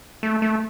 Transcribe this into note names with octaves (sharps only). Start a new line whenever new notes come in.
A3
A3